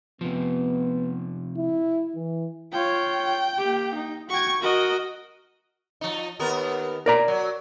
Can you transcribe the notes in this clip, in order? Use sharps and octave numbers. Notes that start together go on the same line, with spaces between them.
C3 F3 B3
E4
E3
F4 C#5 G5
A#3 G4
D#4
F#4 G5 C#6 G#6
F#4 A#4 D#5
F3 D#4
D#2 B3 A#4
A#4 D5 A#5
F#3